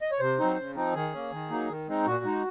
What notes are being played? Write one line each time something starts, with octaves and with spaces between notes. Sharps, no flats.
D#5
C#5
C3 C5
F#3 C4 D#4
C#3
F3 C4 D#4
D#3 G#4
A#3 C#4
D#3
F#3 A#3 D#4
D#3
G#3 C4 D#4
A#2 F#4
G#3 D#4